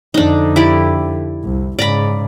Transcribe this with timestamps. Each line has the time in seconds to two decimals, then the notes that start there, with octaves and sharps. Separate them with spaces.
0.14 F2 D3 D4 D#4
0.56 E4 G4 D5
1.44 C2
1.79 G#2 C#3 D5 A#5 B5